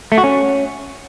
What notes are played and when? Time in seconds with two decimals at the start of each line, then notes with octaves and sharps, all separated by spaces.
0.12 A3
0.18 F#4
0.24 C#4